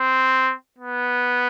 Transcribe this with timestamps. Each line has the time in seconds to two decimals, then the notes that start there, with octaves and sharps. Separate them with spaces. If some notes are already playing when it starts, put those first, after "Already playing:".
Already playing: C4
0.78 B3